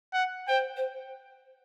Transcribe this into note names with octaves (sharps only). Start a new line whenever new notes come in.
F#5
C5 G5
C5